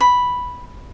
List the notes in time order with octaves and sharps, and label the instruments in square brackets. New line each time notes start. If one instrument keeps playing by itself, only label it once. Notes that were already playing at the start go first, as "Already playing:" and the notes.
[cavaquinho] B5